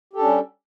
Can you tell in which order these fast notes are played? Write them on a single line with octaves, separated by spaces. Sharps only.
G4 A4 D4 C#4 G3